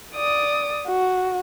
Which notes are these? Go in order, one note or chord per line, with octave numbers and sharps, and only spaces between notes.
D5 D#6
F#4